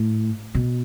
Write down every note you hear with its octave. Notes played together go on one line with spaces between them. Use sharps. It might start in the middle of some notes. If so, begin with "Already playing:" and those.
Already playing: A2
B2